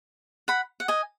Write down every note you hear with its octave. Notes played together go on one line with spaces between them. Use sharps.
F#5 B5
F#5
D#5 G#5